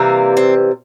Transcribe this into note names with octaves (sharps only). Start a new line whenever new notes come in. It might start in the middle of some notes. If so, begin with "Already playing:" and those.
Already playing: C3 E3 G3 A#3
C4